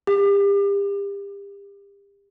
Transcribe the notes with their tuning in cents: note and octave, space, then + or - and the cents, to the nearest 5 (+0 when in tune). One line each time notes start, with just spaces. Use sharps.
G4 +35